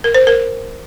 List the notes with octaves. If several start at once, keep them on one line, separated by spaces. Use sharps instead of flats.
A#4
C5
A#4